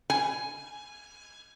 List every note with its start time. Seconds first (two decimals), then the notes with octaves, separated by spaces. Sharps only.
0.10 G#5